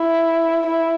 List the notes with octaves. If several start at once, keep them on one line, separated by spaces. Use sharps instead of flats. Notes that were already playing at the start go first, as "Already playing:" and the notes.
Already playing: E4
E4